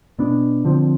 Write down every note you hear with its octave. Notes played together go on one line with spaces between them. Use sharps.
B2 B3 D4
D3 F3 C4